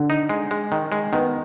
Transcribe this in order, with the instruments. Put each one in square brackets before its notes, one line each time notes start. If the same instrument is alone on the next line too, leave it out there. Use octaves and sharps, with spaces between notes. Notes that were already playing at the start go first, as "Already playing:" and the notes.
Already playing: [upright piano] D3
[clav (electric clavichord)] D#4
G#3
G#3
D#3
G#3
[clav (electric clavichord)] D#3 [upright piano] B3